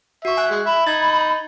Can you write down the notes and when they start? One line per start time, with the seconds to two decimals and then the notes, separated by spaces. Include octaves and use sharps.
0.25 F#4 E5 C#6
0.37 G#5 F#6
0.51 G#3
0.66 E5 B5
0.87 D#4 G#6 A6